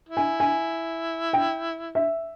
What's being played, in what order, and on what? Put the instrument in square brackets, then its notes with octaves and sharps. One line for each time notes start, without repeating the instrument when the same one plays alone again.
[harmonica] E4
[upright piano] G#5
G#5
G5
E5